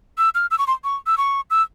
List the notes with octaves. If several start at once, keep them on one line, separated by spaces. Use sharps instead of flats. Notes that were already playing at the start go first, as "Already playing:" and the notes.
E6
F6
E6
C#6
C6
C#6
E6
C#6
E6